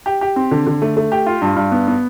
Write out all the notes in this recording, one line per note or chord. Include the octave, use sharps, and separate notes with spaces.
G4
G4
C4
D3
D3
A3
A3
G4
F4
G2
G2
B3
B3